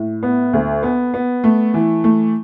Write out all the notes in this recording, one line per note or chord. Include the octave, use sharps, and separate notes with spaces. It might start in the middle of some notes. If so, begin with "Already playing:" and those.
Already playing: A2
B3
D2
B3
B3
A3
E3
A3